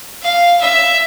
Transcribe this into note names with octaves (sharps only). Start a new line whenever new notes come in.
F5
E5